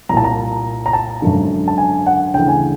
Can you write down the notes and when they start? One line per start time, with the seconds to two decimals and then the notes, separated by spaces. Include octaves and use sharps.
0.09 C2 A#5
0.13 A#2 A5
0.24 A#5
0.86 A#5
0.93 A5
1.22 G#1 F#2 D3
1.68 A5
1.78 G#5
2.06 F#5
2.34 D2 C#3 E3 G5
2.48 G#5